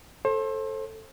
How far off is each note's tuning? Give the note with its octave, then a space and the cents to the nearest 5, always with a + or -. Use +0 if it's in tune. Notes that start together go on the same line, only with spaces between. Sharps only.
A4 +0 C5 +35